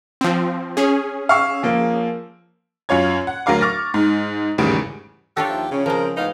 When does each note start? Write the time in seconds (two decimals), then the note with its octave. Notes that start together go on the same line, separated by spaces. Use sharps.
0.21 F3 C4
0.77 C#4 G#4
1.29 F5 C#6 E6
1.63 F3 A#3
2.89 F#2 C#4 F4 C#5 G#6
3.27 F#5
3.46 D2 F#3 A#4 F5 D6
3.61 C#6 D6 F6 A6 A#6
3.94 G#2
4.58 G#1 E2 A2 C#3 G3 D7
5.37 D4 F4 G4 A4 C#5
5.49 D#2 F3 E5
5.71 C#3 F3 C#4
5.86 F3 G#3 C4 A#4 C5
6.17 A2 B3 D#4 F5